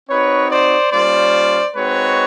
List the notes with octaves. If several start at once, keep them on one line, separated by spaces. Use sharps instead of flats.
C4 D#4 F#4 B4 C#5
C5 D5
G3 A#3 C#4 F4 C5 D5
G#3 C4 D#4 F#4 B4 C#5